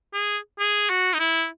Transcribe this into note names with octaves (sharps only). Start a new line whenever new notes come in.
G#4
G#4
F#4
D#4
E4